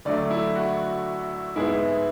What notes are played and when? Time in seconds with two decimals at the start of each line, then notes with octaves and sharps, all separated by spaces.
0.05 D2 D3 F#3 A3 D5
0.31 E4
0.56 F#4
1.55 G#2 G#3 B3 E4